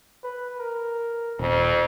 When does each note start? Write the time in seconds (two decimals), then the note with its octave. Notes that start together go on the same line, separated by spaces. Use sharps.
0.23 B4
0.59 A#4
1.39 D#1 F2